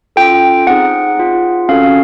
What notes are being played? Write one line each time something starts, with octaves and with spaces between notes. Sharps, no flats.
C#4 F4 A4 G5
C4 D#4 G#4 F#5
C4 F4 G#4
C#4 F#4 A4 F5